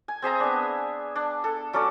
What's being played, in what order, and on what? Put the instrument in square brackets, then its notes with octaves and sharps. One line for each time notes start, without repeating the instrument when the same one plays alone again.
[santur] G#5
C4 G#4 E5 A#5
B3 D4
D4
A4
F#3 C#4 A4 D5